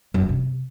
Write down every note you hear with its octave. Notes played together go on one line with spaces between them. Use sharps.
F#2
F3
C3